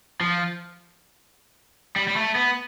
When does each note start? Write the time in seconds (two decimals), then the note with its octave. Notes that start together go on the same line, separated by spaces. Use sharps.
0.21 F3
1.96 G3
2.08 G3
2.16 A3
2.35 B3